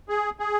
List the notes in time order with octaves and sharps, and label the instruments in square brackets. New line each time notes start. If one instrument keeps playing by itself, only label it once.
[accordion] G#4
G#4